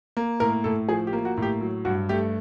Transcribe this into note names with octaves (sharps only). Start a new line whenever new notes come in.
A#3
A2 A#4
A2 A4
F3 G#4
G4
A#3
F#4
A2 G4
F#3
G2 F#4
A3 G4